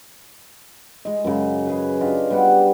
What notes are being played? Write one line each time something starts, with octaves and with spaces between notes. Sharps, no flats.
G#3 D#5
F#2 C#3
G#4 B4
D4 F4 G4 D#5
G3 B3 D5 F#5